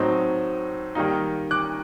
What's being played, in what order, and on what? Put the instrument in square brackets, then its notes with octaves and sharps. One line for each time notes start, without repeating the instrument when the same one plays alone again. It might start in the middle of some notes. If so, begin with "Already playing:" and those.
Already playing: [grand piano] A2 F#3 C4 D#4
D#3 G3 A#3 D#4
D6 F#6